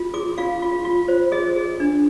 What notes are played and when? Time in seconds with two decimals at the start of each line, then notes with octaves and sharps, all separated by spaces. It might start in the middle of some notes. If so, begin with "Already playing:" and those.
Already playing: F4
0.14 G#4 D6
0.38 F4 F5
0.62 F4
0.85 F4
1.08 C5
1.32 G#4 D#5
1.56 G#4
1.80 D4